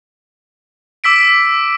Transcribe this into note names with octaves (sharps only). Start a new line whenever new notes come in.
D6 E6 B6 D7